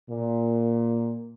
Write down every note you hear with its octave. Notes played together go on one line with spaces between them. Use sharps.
A#2